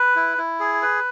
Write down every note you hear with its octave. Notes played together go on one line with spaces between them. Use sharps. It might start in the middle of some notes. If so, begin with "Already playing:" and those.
Already playing: B4
E4
E4
G#4
B4